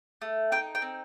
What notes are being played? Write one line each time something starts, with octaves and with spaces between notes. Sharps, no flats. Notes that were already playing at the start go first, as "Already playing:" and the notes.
A3
D#4 G5
G5
C4